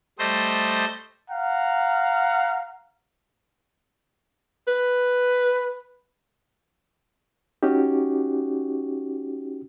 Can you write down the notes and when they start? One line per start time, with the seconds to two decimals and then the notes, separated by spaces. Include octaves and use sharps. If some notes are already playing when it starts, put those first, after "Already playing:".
0.19 G3 A3 C5 D#5
1.30 F5 F#5 A#5
4.68 B4
7.63 C#4 D#4 F#4 G4